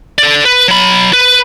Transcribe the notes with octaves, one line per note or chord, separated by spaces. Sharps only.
A4 D5
B4
F#3 B5
B4